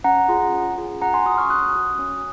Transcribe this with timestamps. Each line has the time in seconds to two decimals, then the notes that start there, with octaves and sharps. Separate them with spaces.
0.04 C#4 F#5 A#5
0.28 F4 G#4
0.52 C#4
0.78 F4 G#4
1.01 C#4 F#5 A#5
1.13 G#5 C6
1.26 F#4 C6 D#6
1.38 C#6 F6
1.50 C#4 D#6 F#6
1.75 F#4
1.99 C#4